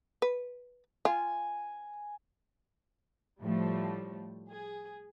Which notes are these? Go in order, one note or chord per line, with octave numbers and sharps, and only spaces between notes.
B4
F4 G#5
A2 F3 G3 A3
G#4